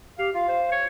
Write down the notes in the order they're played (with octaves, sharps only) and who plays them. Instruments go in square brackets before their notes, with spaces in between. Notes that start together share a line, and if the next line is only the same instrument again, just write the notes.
[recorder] G4 [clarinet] F5
[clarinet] F4 [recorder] F5
[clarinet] C5
C#5